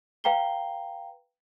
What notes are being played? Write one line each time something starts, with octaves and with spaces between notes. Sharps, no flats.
B4 F5 G5 A#5 C7 G7